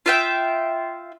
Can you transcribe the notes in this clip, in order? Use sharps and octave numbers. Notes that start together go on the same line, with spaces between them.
F4 E5 G5